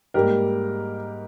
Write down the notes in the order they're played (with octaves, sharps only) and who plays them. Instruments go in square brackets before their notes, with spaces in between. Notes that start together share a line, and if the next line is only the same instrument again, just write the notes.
[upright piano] G#2 G3 A#3 G4 A#4